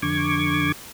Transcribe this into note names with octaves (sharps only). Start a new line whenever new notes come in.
F2 D3 C#6 D6 G#6